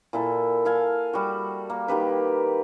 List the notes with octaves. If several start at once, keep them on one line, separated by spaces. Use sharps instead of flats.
A#2 E4 A4
A4 F5 G#5
G3 F#4
A#3
D#3 A#3 G4 B4